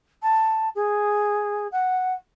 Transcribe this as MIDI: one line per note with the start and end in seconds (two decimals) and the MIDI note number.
0.22 0.69 81
0.75 1.67 68
1.72 2.14 78